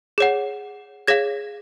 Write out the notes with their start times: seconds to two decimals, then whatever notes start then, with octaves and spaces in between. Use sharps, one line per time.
0.18 G#4 C#5 F#5
1.07 G#4 C#5 F5 G#6 A#6